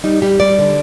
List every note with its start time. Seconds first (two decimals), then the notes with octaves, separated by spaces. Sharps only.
0.04 G3 D#4
0.22 G3 G4
0.40 G3 D5
0.59 D3